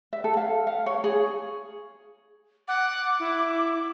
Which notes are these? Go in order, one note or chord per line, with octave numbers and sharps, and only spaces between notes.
E5
A4
F5
F5
C#5
G#4
F#5 D6
E4